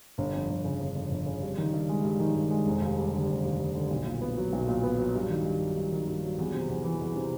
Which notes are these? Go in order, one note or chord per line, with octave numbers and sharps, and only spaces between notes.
G1
F2
G1
C#3
G1
F2
G1
C#3
G2
D#3
G2
G#3
G2
D#3
G2
G#3
F1
D#2
G3
D3
F1
D#2
G3
D3
B1
A#2
B3
F#3
B1
A#2
B3
F#3
G2
D#3
G2
F#3
G2
D#3
G2
F#3
E2
C3
E2
E3
E2
C3